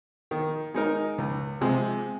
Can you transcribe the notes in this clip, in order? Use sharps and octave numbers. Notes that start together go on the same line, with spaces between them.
D#3
G#3 D#4 A#4
C#2
C3 F3 G#3